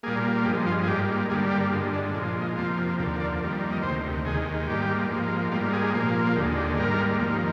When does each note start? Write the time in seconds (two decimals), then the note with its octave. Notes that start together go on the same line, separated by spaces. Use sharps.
0.03 A#2 G3 A#3 G#4
0.46 G2 F3 G#3 G4
0.67 F4
0.84 G#4
0.88 G#2 G3 A#3 G4
1.30 G2 D3 G3 A#3 G#4
1.51 G4
1.72 G2 D3 G#3 F4
1.93 D4
2.14 A#2 F3 G#3 D4
2.28 D4
2.42 D#4
2.56 F2 C3 F3 A#3 F4
2.99 D#2 D3 F3 A#3 G4
3.20 D5
3.41 F2 D#3 G3 A#3
3.72 D#5
3.83 D2 C3 D#3 C5
4.25 D#2 D#3 G#3 G#4
4.67 G#2 G3 A#3 G4
5.10 G#2 F3 A#3
5.52 G#2 G3 A#3 F4
5.73 G#4
5.94 A#2 F3 A#3
6.36 D#2 D3 G#3 G4
6.57 G4
6.78 G#2 G3 A#3 A#4
7.20 F2 D#3 A#3